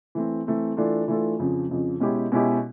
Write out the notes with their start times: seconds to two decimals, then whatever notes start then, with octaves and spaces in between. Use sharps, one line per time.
0.15 E3 A3 C4
0.47 E3 A3 C4
0.77 E3 A3 D4 F4 A4
1.08 E3 A3 D4 F4 A4
1.39 F2 C#3 F3
1.69 F2 C#3 F3
2.00 B2 G#3 C#4 E4 G4
2.32 B2 G#3 C#4 E4 G4